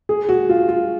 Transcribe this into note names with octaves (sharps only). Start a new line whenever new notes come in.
G#4
F#4
F4
F4